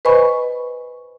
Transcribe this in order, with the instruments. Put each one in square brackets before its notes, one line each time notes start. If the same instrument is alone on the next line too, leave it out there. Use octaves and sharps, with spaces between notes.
[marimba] B4 C5 D#5 G#5 B5 C#6